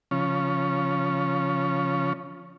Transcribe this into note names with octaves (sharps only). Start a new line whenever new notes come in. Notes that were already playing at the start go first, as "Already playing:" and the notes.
C#3 F3 C#4